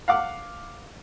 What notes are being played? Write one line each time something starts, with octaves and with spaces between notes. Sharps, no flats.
F5 F#5 D6